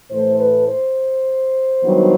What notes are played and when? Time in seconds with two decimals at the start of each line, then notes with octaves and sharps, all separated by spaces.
0.11 A2 E3 A3 C5
0.40 B4
0.68 C5
1.84 G2 D#3 F#3 B3